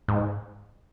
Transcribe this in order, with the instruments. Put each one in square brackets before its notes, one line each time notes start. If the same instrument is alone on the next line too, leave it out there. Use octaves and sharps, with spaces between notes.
[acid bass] G#2